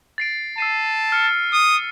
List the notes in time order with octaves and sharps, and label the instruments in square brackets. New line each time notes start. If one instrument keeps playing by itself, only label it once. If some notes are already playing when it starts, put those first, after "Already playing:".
[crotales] A6 C7 D7
[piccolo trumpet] A5 [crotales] E6 C7 D#7
[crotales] F6 C#7
[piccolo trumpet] D#6